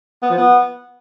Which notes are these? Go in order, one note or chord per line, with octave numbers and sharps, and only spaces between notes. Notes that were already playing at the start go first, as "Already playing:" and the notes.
B3
F3
B3